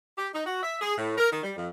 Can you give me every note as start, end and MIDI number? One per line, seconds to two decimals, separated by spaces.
0.18 0.28 67
0.33 0.43 63
0.46 0.61 66
0.63 0.76 76
0.81 0.95 68
0.97 1.18 45
1.18 1.29 70
1.31 1.42 51
1.43 1.52 55
1.57 1.68 41